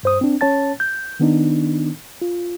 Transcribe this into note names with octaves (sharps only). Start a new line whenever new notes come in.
G2 C5 D#6
C4 D4
C#4 C#5 A5 A6
G6
D#3 B3 D4 D#4
F4